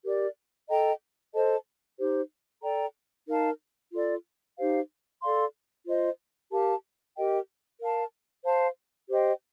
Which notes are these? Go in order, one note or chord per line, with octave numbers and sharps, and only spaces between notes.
G4 A#4 D5
A4 D#5 G5 A#5
A4 C5 D#5 A5
D#4 G4 C5
A4 D5 G5 A#5
D#4 A#4 F5 A5
F4 A4 D5
D#4 G4 C5 F5
A4 D5 F5 C6
F4 C5 D#5
G4 A#4 F5 A5
G4 A#4 D#5 G5
A#4 F5 A5
C5 F5 A5
G4 C5 D#5 G5